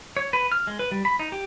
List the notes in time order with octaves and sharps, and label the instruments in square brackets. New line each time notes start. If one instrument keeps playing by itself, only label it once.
[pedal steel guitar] C#5
B4
F6
G#3
B4
G3
B5
D#4
G4